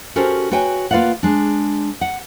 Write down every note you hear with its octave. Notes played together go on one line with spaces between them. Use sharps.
C#4 F#4 G4 A4 A#4 C5
F#4 B4 C#5 G5 G#5
A#3 F4 B4 D5 F5 F#5
G#3 D4
F#5